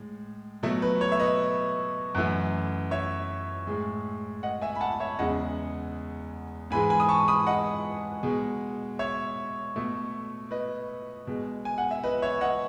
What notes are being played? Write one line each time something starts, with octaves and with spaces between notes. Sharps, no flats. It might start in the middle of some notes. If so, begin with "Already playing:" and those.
Already playing: A2 G#3
B2 F#3 A3
B4
C#5
E5
B4 D#5
F#2 E3 A3
C#5 E5
A2 G#3
D#5 F#5
E5 G#5
B5
F#5 A5
C#5 E5
E2 C#3 G#3 D#5 F#5
G#2 E3 G#3 G#5 B5
G#5 B5
D#6
A5 C#6
B5 D#6
D#5 F#5
B2 G#3
C#5 E5
B2 A3
B4 D#5
B2 G#3
G#5
F#5
E5
B4 D#5
C#5 E5
D#5 F#5